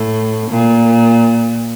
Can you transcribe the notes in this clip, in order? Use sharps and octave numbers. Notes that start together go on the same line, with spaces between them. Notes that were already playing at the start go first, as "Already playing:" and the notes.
Already playing: A2
A#2